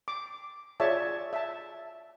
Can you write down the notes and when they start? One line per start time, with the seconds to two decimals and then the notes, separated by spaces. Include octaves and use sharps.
0.08 D6
0.80 F4 G#4 C#5 D5 E5 A5
1.33 E5 A5